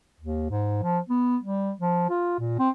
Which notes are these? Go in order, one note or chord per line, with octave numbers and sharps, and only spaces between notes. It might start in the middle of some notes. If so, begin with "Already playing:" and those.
D#2
G#2
F3
B3
G3
F3
F4
A#2
C4